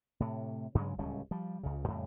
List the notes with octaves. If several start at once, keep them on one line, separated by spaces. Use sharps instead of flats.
A2 C3
G2 C#3 F#3 G#3
D1 C#2 G3 C#4
F3 G3
C#2 C#3
F2 A2 C#3 G3